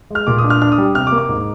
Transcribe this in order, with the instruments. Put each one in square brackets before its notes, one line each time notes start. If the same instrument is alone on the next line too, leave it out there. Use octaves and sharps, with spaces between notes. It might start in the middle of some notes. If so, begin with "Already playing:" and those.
[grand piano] G#3 F6
A#2 D6
D#6
D4
F6
D4 F6
D#6
G3
C3 F6
D6
A#3
D6
G#2